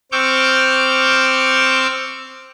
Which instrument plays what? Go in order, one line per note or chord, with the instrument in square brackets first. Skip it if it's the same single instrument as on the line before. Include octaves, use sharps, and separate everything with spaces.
[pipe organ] C4 C#6 D6 E6 F6 G6